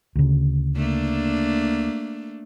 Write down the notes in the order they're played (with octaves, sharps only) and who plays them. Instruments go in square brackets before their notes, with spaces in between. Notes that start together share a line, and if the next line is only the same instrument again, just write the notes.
[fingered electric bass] D2 C#3
[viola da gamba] A3 A#3 D4